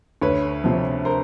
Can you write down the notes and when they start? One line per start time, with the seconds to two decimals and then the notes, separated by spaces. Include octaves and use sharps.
0.22 D2 B4 C#5
0.64 C3 F3
1.05 A#4 C5